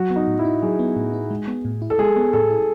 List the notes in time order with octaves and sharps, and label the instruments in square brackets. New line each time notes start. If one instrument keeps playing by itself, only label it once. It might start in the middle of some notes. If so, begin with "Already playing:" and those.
Already playing: [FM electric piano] F#3 [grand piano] F#4
[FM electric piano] B3
[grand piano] D#4
[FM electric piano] A2
[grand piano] E4
[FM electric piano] D#4
[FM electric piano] F#3 [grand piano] G#4
[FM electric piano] B3
A2
D#4
G#3
B3
A2
E4
[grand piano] A4
[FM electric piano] G#3 [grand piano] G#4
[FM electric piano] B3
[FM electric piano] A2 [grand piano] A4
[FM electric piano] E4